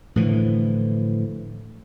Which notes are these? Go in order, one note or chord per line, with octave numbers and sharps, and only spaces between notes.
A2 D3 E3 F3